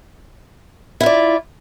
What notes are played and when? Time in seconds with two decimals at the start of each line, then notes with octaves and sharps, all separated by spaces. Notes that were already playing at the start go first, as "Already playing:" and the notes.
1.00 E4
1.03 F4
1.06 D5